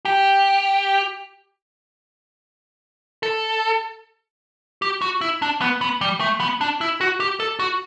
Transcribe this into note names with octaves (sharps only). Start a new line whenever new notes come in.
G4
A4
G4
F#4
E4
D4
B3
B3
G3
A3
B3
D4
E4
F#4
G4
A4
F#4